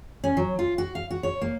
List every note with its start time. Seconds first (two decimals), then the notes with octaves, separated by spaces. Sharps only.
0.24 C#4
0.37 F#3
0.59 F4
0.78 F#4
0.95 F5
1.11 F#4
1.23 C#5
1.42 A#3